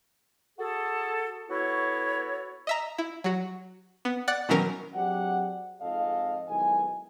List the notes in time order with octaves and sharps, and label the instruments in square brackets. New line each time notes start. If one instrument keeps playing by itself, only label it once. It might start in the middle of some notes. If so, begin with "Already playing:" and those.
[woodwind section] F#4 G#4 A4
B3 E4 F#4 A4 C#5
[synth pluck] D#5 E5 A#5
E4
F#3 F#4
B3
D5 F#5 F#6 A6
B2 D#3 E3 F#3 C#4 A#4
[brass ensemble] F#3 C4 D4 G4 G#4 F#5
F2 G#2 A4 D#5 F5
B1 D#3 G#3 E4 G#5